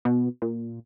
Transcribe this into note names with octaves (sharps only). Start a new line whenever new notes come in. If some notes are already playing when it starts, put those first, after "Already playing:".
B2
A#2